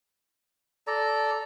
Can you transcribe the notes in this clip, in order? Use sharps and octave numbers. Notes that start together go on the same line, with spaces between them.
A4 D5 A#5